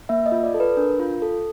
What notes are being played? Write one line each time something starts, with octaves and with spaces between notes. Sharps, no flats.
A#3 E5
D#5
F4
D5
A4
B4
D4 A#4
F4
A4